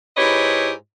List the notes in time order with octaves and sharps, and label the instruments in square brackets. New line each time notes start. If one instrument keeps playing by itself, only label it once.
[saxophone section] G#2 E4 G4 B4 C#5 D#5